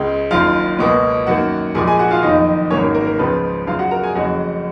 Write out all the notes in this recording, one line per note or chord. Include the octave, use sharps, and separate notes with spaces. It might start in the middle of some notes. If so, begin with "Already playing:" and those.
Already playing: C#2 C#3 G#3
F#1 F#2 D#3 F4 F5
C#2 B2 A#3
F#2 D#3 A#3 F#4 F#5
A#1 A#2 G#3 G#4 G#5
G#4 G#5
F#4 F#5
F4 F5
F#1 F2 D#3 D#4 D#5
G#1 G#2 F#3 A#3 C#4 C#5
A#4
A#4
A#4
C#2 C#3 F3 B3 B4
F#2 C#3 F#3 F4 F5
F#4 F#5
A#4 A#5
G#4 G#5
F#1 F2 C#3 G#3 F#4 F#5